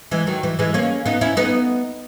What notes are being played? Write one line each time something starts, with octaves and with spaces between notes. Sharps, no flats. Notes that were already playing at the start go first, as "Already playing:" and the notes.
E3 G#3
D#3 F#3
E3
E3 G#3
A#3 C#4
B3 D#4
C#4 E4
B3 D#4